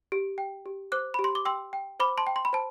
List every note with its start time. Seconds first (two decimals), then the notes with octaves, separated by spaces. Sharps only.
0.12 G4
0.38 G5
0.66 G4
0.92 C5 D6 F#6
1.14 G4 B5
1.24 C6
1.35 D6
1.45 G5 C6 E6
1.73 G5
2.00 C5 B5 D6
2.18 A5 C6
2.27 G5
2.36 C6
2.45 B5
2.53 C5 A5